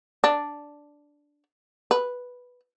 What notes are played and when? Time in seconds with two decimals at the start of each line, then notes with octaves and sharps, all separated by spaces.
0.24 D4
1.91 B4